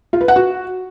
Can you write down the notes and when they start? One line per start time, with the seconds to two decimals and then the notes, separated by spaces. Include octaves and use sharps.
0.13 F4
0.21 B4
0.28 F#5
0.36 F#4